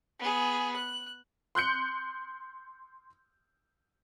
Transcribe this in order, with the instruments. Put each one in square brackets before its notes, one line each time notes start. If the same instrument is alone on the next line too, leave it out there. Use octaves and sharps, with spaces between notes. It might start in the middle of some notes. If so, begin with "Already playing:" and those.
[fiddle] B3 G#4
F#6
[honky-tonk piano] C6 F#6 G6 C#7